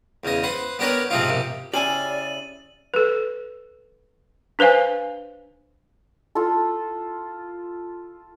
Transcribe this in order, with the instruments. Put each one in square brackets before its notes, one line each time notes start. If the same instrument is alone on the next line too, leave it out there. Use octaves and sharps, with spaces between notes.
[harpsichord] E2 C#3 D#5
B4 C5 F#5
B3 D4 G4 A#4 B4 C#5
G#2 C3 F3 C4 D#4 F4
A#1 C3
[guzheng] C#3 E4 [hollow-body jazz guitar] G4 G#5 [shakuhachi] D5 [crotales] D#7 F#7
[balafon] A4 B4
D4 B4 C5 F5 G#5
[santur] F4 A4